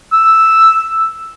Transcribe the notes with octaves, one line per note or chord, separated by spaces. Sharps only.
E6